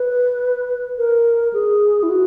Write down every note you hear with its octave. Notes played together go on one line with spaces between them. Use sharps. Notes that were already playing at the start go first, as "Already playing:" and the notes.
Already playing: B4
A#4
G#4
E4
F#4